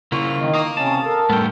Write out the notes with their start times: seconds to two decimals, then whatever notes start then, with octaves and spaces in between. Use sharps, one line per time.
0.12 C#3 A#3 E4 F4 C#6
0.37 D#3
0.54 F5 A#5 D#6
0.77 C3 C#4 A5
1.05 A4 A#4
1.30 A2 G3 A3 B3 G5